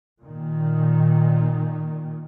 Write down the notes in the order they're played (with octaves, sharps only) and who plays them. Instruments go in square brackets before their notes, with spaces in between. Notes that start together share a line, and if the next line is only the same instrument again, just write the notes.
[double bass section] A#2 D#3